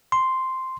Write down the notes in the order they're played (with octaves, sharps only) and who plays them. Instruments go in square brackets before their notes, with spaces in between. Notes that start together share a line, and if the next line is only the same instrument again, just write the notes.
[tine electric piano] C6